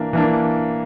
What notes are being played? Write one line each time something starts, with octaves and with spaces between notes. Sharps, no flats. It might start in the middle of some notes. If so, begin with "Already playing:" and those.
Already playing: E3 A#3 D4
E3 A#3 D4